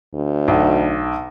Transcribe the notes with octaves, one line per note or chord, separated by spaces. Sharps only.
D2
B1